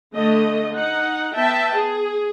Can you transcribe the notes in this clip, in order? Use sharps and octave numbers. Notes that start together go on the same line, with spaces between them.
D3 A3 D#5
D#4 F#5
B3 E5 G5 A5
G#4